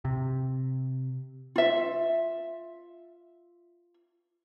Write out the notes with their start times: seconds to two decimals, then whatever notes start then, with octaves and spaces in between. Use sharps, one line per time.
0.05 C3
1.56 F4 E5